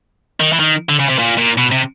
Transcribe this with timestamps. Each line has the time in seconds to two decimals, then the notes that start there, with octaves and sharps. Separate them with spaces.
0.40 D#3
0.53 E3
0.60 D#3
0.89 D3
1.00 C#3
1.10 C3
1.19 A#2
1.38 A#2
1.58 B2
1.71 C3